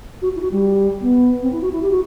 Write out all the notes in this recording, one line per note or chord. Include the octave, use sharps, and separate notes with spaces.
F#4
E4
F#4
G3
B3
C4
E4
F#4
E4
G4
F#4